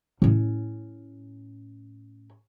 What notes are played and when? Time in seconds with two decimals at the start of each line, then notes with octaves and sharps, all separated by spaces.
0.22 A2 C#4